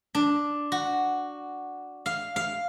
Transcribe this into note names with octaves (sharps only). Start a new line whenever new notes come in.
D4
F#4
F5
F5